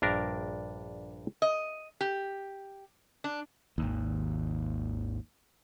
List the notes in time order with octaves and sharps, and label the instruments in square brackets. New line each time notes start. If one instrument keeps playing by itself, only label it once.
[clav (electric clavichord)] A#1 G2 D4 A#4 A#5
[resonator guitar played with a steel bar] D#5
G4
D4
[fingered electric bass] G#1 D#2